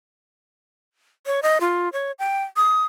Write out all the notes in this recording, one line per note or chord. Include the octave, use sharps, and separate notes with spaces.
C#5
D#5
F4
C#5
G5
D#6